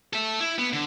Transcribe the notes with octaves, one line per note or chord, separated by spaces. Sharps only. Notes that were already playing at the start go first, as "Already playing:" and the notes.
A4 E5
E4
B3
D3